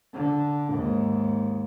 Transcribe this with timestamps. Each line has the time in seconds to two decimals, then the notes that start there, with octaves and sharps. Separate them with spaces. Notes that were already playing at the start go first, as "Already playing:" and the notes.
0.14 D3
0.70 D#2 G#2